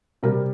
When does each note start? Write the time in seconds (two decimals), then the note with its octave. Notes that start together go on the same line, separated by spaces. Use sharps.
0.23 C3 G3 A#4